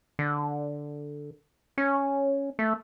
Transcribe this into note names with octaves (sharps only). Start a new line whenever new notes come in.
D3
C#4
A3